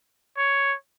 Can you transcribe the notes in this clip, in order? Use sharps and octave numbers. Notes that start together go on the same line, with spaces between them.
C#5